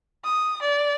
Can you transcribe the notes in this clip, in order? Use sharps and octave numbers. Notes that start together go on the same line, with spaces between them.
D#6
D5